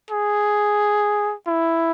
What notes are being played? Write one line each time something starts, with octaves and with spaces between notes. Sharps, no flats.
G#4
E4